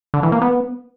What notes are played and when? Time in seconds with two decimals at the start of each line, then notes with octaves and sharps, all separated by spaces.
0.14 D3
0.23 E3
0.32 A#3
0.42 B3